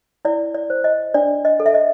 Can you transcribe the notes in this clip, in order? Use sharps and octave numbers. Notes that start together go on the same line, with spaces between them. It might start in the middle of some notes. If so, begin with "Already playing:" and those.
E4 D5
D5
C5
D#5
D4 D5
D#5
A4
E5
D#5